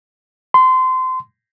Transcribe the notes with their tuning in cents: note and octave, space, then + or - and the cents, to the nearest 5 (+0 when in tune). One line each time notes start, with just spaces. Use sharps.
C6 -25